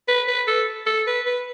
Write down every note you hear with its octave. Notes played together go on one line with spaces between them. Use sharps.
B4
B4
A4
A4
B4
B4